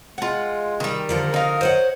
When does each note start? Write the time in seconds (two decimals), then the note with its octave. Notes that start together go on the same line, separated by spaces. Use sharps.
0.18 G#3 F4 F#5
0.80 D#3 G3
1.09 D3 F3 A4 A#4
1.34 D#4 F5
1.61 C5 C#5 D#5 F#5